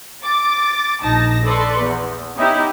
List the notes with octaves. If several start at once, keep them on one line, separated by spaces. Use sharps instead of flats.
D6 A6
A#1 D#4 A5 A#6
A4 B4 D5 C6 C#6
E2
B3 C#4 D#4 E4 G4